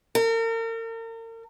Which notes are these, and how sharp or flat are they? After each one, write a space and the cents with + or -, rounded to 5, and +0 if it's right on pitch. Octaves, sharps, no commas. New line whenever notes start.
A#4 -40